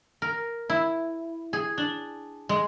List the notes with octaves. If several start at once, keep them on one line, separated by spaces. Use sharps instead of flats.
A#4
E4
G#4
D4
G#3